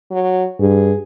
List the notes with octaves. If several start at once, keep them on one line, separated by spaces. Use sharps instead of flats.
F#3
G2 G#4